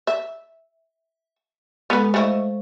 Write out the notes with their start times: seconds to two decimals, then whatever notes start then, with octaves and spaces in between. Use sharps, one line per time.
0.07 E5
1.90 G#3 B3 A4 B4
2.14 A3 E4 C5 D#5 F5 C#6